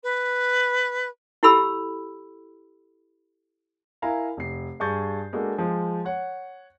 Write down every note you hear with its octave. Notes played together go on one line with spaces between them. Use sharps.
B4
E4 G4 A4 B5 E6
E4 A#4 F5 G#5 A#5
F1 C7
G2 G#4 C#6 G6 A6
G#3 A#3 D4 F#4 A4
F3 G#3
C#5 F#5